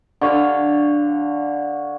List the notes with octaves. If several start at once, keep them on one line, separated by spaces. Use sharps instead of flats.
D3 C#5 F5